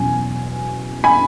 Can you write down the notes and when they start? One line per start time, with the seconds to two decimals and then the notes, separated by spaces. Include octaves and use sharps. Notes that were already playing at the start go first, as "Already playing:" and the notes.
Already playing: E2 B2 F#3 C#4 G#5
1.04 G#5 B5